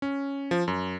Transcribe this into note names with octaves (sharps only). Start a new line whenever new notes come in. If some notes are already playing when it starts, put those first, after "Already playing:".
C#4
F3
F#2